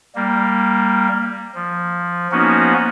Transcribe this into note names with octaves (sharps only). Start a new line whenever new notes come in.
G3 A#3
F3
F3 A#3 B3 C#4 D#4 F#4